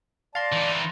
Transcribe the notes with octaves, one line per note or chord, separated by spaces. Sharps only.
D5 F5 A5 C6 A6 A#6
E3 D#4